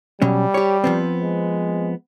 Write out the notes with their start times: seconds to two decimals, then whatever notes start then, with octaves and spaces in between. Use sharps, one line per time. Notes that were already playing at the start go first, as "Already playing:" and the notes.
0.22 B2 F#3 G3 C#4
0.54 G4 C#5
0.84 F3 B3 C4
1.22 G#3